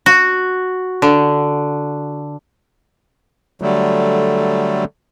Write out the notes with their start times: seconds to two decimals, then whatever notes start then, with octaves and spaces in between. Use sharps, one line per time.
0.06 F#4
1.02 D3
3.62 D3 F#3 G3 A3